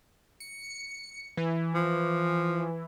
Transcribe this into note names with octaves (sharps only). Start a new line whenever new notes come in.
C#7
E3
F3